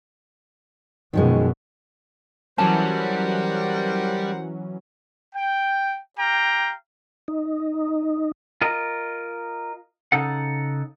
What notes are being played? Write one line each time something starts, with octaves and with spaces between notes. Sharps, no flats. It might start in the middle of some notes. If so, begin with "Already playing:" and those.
F#2 B2 D#3 F3 G#3
E3 F#3 G3 C#4 A#4 C5 F#5 A5
G5
G4 F5 G5 A#5
D#4
F4 A#4 D#5
C#3 D#4 A4 F#5